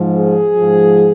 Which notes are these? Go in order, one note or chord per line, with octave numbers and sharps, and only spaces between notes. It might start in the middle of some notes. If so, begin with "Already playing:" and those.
Already playing: G#2 F3
G#4
G#2 F3